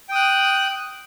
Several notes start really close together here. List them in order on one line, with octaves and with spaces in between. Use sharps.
G5 D#6 F#6